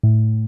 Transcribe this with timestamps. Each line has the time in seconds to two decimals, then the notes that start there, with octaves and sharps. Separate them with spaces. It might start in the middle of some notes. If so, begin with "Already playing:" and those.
0.03 A2